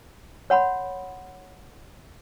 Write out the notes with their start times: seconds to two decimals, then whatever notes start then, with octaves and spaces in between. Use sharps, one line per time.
0.50 C#5 F#5 B5 C6